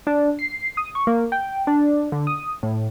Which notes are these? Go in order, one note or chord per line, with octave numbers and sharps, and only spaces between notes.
D4
C7
D#6
C#6
A#3
G5
D4
D3
D#6
A2